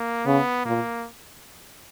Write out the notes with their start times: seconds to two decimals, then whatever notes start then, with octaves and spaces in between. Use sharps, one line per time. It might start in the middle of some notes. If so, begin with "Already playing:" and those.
Already playing: A#3
0.26 C#3 B3
0.65 A#2 A#3